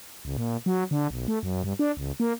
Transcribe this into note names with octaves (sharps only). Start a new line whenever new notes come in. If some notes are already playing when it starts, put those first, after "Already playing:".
C#2
A#2
F#3
D3
B1
A3
F#2
G2
D4
C#2
A#3